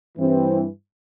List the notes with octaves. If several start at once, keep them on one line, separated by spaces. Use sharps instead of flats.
G2 E3 C4